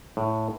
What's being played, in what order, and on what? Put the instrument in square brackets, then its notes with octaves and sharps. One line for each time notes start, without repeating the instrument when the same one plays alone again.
[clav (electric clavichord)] A2